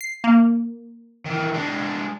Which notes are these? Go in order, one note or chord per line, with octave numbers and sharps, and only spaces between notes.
C7
A#3
D#3 E3
G#3 D4